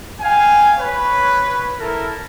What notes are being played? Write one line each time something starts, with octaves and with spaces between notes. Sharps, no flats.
F5 G5 G#5
B4 C#5
E4 A4 A#4